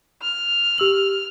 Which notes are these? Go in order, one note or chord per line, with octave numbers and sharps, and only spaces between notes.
F6
G4 E6 F#7